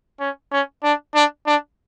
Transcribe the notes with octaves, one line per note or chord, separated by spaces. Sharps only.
C#4
C#4
D4
D4
D4